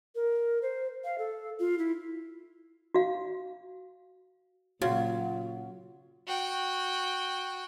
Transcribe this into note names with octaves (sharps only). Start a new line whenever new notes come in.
A#4
C5
F5
A4
F4
E4
F#4 F5
A#2 C#3 F#3 F4 F#4
F#4 G5